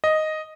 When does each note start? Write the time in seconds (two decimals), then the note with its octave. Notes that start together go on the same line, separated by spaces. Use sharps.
0.04 D#5